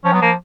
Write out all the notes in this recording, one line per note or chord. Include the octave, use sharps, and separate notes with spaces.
F3 C#4
F#3 B3
F3 A#3